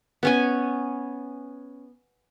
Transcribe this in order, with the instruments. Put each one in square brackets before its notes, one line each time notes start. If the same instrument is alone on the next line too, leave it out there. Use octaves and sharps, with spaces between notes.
[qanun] B3 C#4 G#5